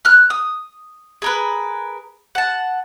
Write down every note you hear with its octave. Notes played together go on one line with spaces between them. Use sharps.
F6 F#6
D#6
G#4 A#4 B4
F#5 A5